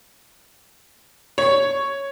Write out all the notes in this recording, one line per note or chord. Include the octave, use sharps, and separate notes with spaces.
C#5